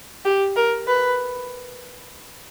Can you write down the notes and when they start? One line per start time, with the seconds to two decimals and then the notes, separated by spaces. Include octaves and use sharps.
0.25 G4
0.56 A#4
0.87 B4